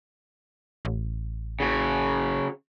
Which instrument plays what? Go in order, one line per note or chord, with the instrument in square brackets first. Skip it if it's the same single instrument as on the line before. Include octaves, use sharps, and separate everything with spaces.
[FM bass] A1
[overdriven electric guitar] C#3 F#4